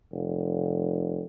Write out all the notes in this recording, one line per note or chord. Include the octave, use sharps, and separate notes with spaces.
F1